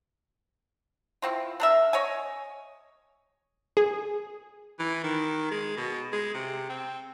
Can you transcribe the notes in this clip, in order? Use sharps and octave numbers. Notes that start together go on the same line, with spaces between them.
E3 C4 F4
D4 A#4 E5
C#5 D#5 G#5
G#4
E3
D#3
G#3
B2
G#3
C3
C4